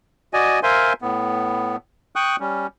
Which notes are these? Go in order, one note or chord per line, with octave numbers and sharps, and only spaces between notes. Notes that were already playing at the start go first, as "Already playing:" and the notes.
F#4 D5 D#5 G#5
A#4 C5 E5 F5 G#5 C6
A2 B3
G5 C#6 D#6 F#6
G3 C#4